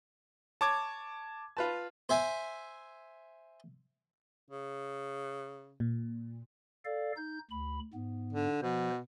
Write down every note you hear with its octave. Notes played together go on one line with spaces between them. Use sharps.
C#5 A5 D6 G#6
F4 B4 A5
C5 E5 G#5
C#3
A#2
A4 D5 F5
D#4 G6
D2 B5
G#2 B3
D3
B2 F3 C5